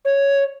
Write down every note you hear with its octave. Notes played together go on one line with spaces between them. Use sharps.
C#5